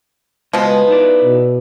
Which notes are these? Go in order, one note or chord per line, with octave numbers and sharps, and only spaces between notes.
C#2 B2 F3 G#3 B3 D#5
D#4 E4 D5
B2